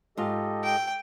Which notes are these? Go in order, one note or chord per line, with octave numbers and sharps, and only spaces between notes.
G#2 F4 G4 A4 D#5
G5